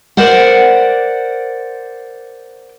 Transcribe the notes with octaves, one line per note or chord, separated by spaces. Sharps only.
A#4 C5 D5 F#5